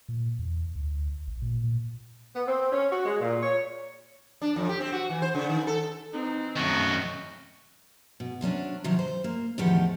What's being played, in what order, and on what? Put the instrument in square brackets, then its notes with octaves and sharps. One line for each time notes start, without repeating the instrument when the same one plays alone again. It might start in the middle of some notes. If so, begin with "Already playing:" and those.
[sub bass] A#2
E2
D2
A1
A#2
A#2
[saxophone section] B3
C4
C#4
F#4
G#3
A#2
C#5
[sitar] D4
F2
G4
C4
F#4
E3
C5
C#3
D#3
A4
[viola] E3 C4 [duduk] D#4
[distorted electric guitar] F#2 D#3 [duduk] A3 [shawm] F#4
[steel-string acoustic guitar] B2
C3 F#3 C#4 D4
C3 D#3 F3 F#3
C5
A#3
E2 A2 D#3 F3 G4 F#5